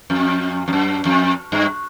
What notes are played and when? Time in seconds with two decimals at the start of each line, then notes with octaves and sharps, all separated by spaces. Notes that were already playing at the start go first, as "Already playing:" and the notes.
0.10 F2
0.68 F2
0.73 F#2
1.05 F2
1.52 G2